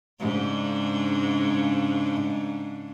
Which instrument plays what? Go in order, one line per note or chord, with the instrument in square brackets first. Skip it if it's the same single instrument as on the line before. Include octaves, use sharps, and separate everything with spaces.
[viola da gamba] G#2 C#3 D4